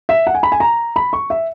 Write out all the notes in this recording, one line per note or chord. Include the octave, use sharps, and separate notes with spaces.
E5
F#5
G#5
B5
G#5
A#5
B5
C#6
E5